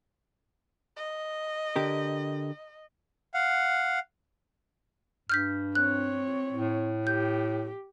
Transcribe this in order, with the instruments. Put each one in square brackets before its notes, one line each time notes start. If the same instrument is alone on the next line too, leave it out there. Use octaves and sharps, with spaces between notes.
[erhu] D#5
[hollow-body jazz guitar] D3 G4 A#4
[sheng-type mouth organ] F5 F#5
[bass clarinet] G2 [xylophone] F6 G6 B6
[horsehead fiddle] C4 C#5 [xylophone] F#6
[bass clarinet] A2
[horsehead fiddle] G4 [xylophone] G6